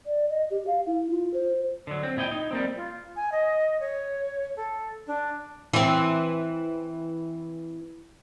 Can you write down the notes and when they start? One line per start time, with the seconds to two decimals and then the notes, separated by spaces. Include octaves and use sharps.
0.06 D5
0.29 D#5
0.50 G4
0.67 F5
0.86 E4
1.11 F4
1.34 C5
1.87 D3 F#3
2.03 C4
2.17 A#2 E4 D#5 G5
2.31 D#4
2.51 G3 A#3 C4
2.76 F4
3.16 G#5
3.32 D#5
3.80 C#5
4.56 A4
5.07 D4
5.73 E3 C4